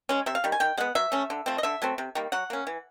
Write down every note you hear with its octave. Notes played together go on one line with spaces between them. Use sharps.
G#3 C#4
C3 E5
F5
D#3 G3
G#5
D#3 G5
G#3 B3 F#5
F#3 E5
A3 C#4
D3
F3 A3 C4
D#5
D3 E5
F#3 A3 C4
C3
D#3 G3 A#3
F#3 F#5
A#3 C#4
E3